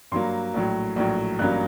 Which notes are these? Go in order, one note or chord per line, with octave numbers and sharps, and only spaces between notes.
G2 F#3 A#3 C6
A#1 A2 F#3
A#1 A2 F#3
A1 G2 F#3 A#3 F#6